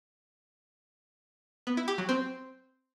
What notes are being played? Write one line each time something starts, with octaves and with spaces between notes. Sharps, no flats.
B3
E4
G4
F#3
C4